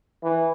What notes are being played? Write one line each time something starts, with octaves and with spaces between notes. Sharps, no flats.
E3